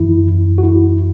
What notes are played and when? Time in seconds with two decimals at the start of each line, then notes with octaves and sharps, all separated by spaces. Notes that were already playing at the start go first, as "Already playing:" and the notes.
Already playing: F#2 E3 E4
0.58 F#4
0.63 E4